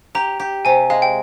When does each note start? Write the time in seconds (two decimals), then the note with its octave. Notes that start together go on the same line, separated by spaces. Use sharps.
0.15 G4 A#5
0.40 G4
0.65 C3 G#5
0.90 G#3 F5
1.02 G5